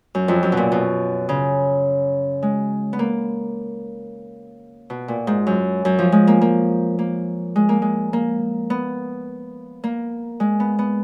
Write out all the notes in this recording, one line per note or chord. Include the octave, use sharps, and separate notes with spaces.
F#2
F2
F#2
B2
A#2
B2
C#3
G#3
B3
A#3
B2
A#2
G#2
F#2
F#2
F3
G#3
A#3
A#3
A#3
G#3
A#3
G#3
A#3
B3
A#3
G#3
B3
B3